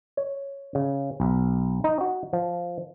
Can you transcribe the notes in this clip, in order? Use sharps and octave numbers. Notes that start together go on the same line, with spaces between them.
C#5
C#3
B1
D#4
F#4
F3